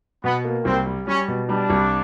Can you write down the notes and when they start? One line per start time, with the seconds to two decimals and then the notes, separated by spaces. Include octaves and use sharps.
0.23 B2 B3
0.45 A#3
0.65 C2 C4
0.86 G3
1.07 G3 C#4
1.28 B2
1.49 G3 D4
1.70 C2